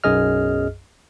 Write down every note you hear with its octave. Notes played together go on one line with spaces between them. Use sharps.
B1 F#2 G#4 D#5 F6